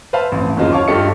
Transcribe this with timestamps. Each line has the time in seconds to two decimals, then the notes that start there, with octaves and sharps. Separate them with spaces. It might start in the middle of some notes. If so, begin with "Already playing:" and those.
0.13 B4 C5 E5 F5 A5 B5
0.32 A1 F2
0.57 F#1 D#2 C#3 D#4 F4
0.72 C#5 F5 A5 C#6 D6
0.88 G2 F4 G4 A4 D#5 C#7